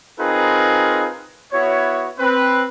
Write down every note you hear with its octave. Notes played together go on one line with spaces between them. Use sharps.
C4 D#4 F4 G#4 A#4 B4
B3 E4 F#4 C#5
C4 B4